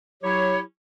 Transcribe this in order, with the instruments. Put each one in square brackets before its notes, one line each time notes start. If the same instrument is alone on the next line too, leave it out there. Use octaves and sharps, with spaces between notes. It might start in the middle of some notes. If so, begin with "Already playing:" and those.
[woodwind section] F#3 E4 G4 C#5